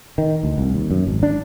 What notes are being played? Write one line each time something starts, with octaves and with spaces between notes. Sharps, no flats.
D#3
D2
C2
D#2
F#2
G#1
D4